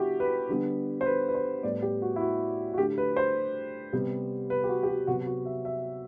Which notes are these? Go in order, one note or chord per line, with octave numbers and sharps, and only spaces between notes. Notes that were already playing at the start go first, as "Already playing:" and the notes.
Already playing: D3 G3 B3 E4 F#4 G4
B4
D3 G3 B3
C5
B4
B4
C5
A2 G3 B3 D5
G4
F#4
E4
F#4
F#4
D3 A3 G4
B4
C5
C3 G3 B3
B4
G4
F#4
G4
F#4
C3 F#3 B3 F#4
F#4
E5
E5